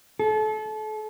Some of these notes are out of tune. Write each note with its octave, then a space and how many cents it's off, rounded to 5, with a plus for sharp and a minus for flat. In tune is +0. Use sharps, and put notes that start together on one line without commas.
A4 -30